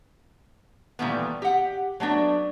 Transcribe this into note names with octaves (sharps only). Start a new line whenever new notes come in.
A#2 D#3 E3 G3 A3 B3
G4 F#5
F#3 A3 B3 D4